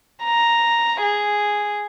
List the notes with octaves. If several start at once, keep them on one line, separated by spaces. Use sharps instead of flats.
A#5
G#4